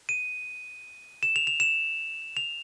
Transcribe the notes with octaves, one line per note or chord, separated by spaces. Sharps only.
D#7
E7
F7
F7
E7
F7